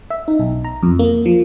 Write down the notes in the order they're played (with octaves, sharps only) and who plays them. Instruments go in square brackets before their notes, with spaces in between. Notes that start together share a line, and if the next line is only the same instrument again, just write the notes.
[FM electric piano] E5
D#4
B1
A#5
F2
A#3
F3